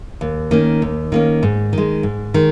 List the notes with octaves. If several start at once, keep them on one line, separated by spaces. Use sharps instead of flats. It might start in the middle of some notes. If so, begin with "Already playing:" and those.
D#2
D#3 A#3 C#4
D#2
D#3 A#3 C#4
G#2
D#3 G#3
G#2
D#3 G#3